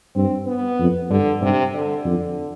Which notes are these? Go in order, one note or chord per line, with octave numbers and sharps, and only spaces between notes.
G2 C4
B3
F2
G2 D3
G2 C3
D3
F2 D3